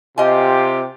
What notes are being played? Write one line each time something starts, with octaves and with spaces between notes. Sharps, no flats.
C3 F4 G4 D#5 G#5